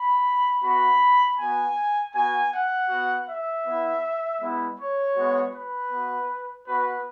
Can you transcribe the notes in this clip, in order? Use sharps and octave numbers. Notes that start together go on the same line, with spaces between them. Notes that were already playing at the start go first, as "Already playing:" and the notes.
Already playing: B5
B3 F#4 B5
B3 F#4 G#5
B3 F#4 G#5
F#5
B3 F#4
E5
B3 E4
G#3 B3 E4
C#5
G#3 B3 F#4
B4
B3 F#4
B3 F#4 B4